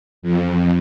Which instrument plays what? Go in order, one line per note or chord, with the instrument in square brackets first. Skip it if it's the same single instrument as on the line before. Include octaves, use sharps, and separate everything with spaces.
[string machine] F2